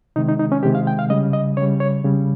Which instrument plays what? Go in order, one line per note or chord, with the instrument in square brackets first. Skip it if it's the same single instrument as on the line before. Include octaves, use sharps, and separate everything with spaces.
[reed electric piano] C3 D#3 G#3 D#4
D#4
D#4
C#4
C3 D#3 G#3 G4
F5
G5
F5
C#3 G3 D#5
D#5
C#3 G3 C#5
C#5
C#3 G3